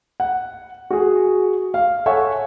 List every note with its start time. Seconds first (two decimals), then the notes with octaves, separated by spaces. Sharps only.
0.20 F#5
0.90 F#4 G#4
1.74 F5
2.06 A4 C#5 E5 F#5 G#5 C#6